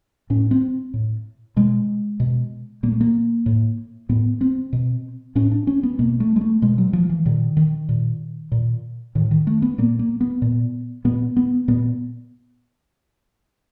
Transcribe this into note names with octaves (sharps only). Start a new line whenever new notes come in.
A2 C#4
C4
A2
B2 G#3
B2
A#2 A#3
A3
A#3
A2
A2 B3
C4
B2
A2 C#4
D4
C#4
B3
B2 A#3
A3
G#3
A3
B2 G#3
F#3
F3
E3
A#2 D#3
D#3
A#2
A#2
A2 D#3
D#3
A3
B3
A#2 A#3
A#3
B3
A#2
A#2 B3
B3
A#2 B3